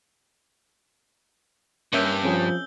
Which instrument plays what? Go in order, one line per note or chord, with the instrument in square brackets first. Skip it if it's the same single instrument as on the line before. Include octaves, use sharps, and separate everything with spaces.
[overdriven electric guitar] G2 [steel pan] A#3 C#4 E5 [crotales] E6 G6 G7
[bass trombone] F3 [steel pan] C4 C#4 G#4